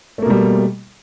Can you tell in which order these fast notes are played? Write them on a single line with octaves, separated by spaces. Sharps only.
A3 A#3 B2 G3